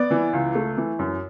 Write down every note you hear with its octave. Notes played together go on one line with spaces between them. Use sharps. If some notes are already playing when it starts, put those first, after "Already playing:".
Already playing: B3 D5
E3
C#2
A3
E3
F#2